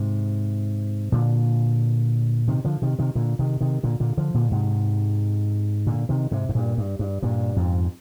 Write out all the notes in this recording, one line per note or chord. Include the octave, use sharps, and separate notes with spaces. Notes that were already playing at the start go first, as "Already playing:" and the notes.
Already playing: G#2 C3
A#2 D3
C3 D#3
D3 F3
C3 D#3
C3 D#3
A#2 D3
C3 D#3
C3 D#3
A#2 D3
A#2 D3
D3 F3
A#2 D3
G#2 C3
A#2 D3
C3 D#3
G#2 C3
G#2
G2 A#2
G2
G2
G2 A#2
F2 G#2